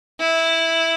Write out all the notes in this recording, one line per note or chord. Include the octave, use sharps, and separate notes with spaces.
E4